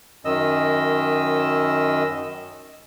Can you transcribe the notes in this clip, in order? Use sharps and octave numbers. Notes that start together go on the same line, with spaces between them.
F#2 D#3 D#5 E6